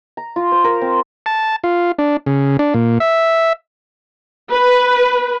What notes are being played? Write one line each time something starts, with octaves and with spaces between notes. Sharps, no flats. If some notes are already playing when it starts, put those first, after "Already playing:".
A#5
F4
C5
A#4
C4
A5
F4
D4
C#3
D4
A#2
E5
B4